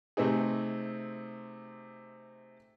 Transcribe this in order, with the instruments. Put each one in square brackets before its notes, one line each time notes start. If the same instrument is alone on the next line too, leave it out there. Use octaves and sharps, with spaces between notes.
[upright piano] C3 A3 C4 D#4 G#4